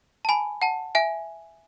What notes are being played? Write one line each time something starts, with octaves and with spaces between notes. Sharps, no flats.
A5
G#5 B5
F#5 A5
E5 G#5